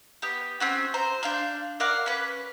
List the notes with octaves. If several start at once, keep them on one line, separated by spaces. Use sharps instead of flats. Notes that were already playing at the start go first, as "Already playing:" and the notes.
B3 G4
C4 C#4 F#4
C5 A#5
D4 F5 G6
A#4 D5 F5 F#5
C#4 B4